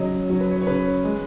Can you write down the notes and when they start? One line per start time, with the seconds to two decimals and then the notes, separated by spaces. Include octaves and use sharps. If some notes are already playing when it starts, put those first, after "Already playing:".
Already playing: C#3 F#3 D#5
0.30 F#3 C#5
0.41 B4
0.51 C#5
0.61 C#5
0.67 C#3 B4
1.04 G#3